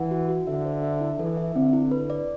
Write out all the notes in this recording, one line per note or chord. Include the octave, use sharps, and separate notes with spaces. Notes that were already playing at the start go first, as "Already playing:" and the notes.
Already playing: E3 F#5
F#4
F#4
D3 E5
C5
E5
E4
E3 A4
E5
D3 C4
E4
B4
D5